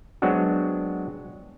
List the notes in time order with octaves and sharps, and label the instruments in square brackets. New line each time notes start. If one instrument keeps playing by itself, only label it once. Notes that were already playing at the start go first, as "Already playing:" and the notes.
[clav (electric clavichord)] F#3 G#3 B3 C4 D4 F#4